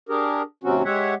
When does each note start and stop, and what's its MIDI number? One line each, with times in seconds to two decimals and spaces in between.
0.09 0.42 62
0.09 0.42 67
0.09 0.42 68
0.09 0.42 70
0.64 0.83 39
0.64 0.83 48
0.64 0.83 54
0.64 0.83 60
0.64 0.83 61
0.64 0.83 66
0.85 1.14 56
0.85 1.14 67
0.85 1.14 73
0.85 1.14 76
0.85 1.14 78